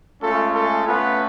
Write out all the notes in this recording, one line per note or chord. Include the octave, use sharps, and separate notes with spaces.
G#3 A3 C#4 F4 A4
A3 A4
A3 B3 C#4 F4 B4